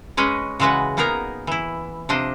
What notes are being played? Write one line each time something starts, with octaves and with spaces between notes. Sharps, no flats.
G#3 C#4 B4 D#5
C#3 E3 G#3 F#4 B4 F#5
A#3 B3 D#4 G#4 A#4 A#5
E3 E4
C3 F3 D4 C5 D#5